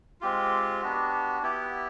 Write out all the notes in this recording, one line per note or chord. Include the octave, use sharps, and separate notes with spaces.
G#3 C4 F4 G4
B3 D4 F#4
B3 E4 G4